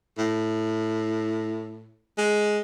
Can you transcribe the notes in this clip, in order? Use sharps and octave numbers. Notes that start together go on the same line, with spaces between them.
A2
G#3